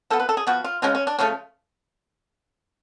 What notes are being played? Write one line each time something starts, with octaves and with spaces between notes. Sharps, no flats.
F3 B3 A4
B4
A4
G#4
F3 B3 F#4
F4
C#3 G#3 C#4 F4
C#4
D4
C#3 F3 A3 C#4